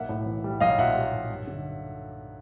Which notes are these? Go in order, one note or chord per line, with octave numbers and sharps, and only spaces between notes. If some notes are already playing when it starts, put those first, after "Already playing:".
Already playing: B1 A#3 E5 F#5
A2
E3
G3
B1 D#5 F5
A#2 E5 F#5
G3
B1
G2
D3